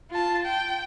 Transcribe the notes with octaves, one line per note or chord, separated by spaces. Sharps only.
F4 A5
G5